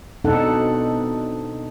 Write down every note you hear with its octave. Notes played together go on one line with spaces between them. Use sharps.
B2 C4 D4 D#4 A4 F#5